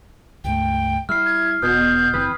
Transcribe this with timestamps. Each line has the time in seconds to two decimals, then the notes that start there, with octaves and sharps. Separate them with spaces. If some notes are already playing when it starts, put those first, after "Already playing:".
0.44 C#2 G2 A3 G5
1.09 G3 E4 F6 C7
1.26 G#6
1.62 E1 B2 D#6 G6 G#6 C7
2.13 F#1 E3 C4 B4 D#6